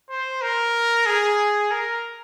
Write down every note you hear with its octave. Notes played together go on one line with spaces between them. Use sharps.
C5
A#4
G#4
A#4